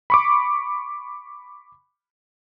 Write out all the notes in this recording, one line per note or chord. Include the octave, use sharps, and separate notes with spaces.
B5 C#6 D6